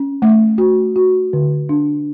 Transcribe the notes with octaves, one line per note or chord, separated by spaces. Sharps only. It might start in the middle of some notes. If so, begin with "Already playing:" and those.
Already playing: C#4
A3
F#4
F#4
D3
D4